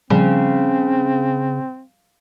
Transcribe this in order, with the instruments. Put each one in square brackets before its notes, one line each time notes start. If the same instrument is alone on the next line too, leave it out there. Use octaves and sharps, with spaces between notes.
[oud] C#3 [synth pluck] F3 G3 [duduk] C4